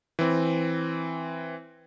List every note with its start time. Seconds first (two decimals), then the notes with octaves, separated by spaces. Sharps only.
0.19 E3 C4